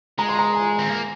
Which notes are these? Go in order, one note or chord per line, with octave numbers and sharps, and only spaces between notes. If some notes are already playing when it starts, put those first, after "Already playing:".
G#3 A#5
C6
A#5
G#5
C4
A#3